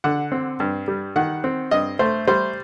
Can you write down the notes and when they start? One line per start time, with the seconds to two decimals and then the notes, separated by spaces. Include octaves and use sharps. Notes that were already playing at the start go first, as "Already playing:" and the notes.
0.04 D3 F#5
0.32 C4
0.60 G2
0.88 G3
1.16 D#3 F#5
1.44 C4
1.71 G2 D#5
1.99 A3 C5
2.28 G3 C5